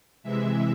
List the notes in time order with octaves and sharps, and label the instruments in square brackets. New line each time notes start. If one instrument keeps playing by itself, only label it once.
[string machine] C3 E3 G#3 E5